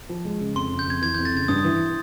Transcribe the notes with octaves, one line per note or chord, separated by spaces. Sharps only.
F3
G#3
C#3
F2 C6
C#3
G6
F2 G#6
E3 G#6
G6
F2
A6
C#3 G#6
G2 D#6
E3